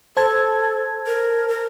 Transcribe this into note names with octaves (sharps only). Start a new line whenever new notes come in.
A4 C5 A5 G#6
A#4
A#4